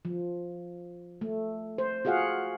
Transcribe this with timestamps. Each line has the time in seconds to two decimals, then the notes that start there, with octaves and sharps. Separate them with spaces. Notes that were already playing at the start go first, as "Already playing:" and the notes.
0.05 F3
1.21 A3
1.78 C5
2.05 F4 F#4 G#4 F5 F#5